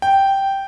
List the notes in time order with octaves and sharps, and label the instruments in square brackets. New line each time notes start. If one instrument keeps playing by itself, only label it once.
[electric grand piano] G5